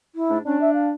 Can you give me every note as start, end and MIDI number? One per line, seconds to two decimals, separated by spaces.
0.15 0.38 64
0.30 0.39 44
0.30 0.39 57
0.30 0.39 62
0.46 0.60 61
0.46 0.93 62
0.61 0.73 76
0.73 0.88 77